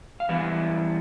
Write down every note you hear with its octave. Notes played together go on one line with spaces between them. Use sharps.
F5
E3 G3 B3 E4 E5